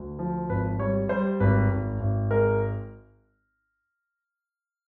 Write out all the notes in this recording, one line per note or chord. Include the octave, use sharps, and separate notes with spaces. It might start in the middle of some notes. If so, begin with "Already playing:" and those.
Already playing: D2
F3
G#1 B4
G3 C#5
G3 C5
G#1 B4
G#1
G#1
G#3 A#4